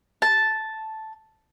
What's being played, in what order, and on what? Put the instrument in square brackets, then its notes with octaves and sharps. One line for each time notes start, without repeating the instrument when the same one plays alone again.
[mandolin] A5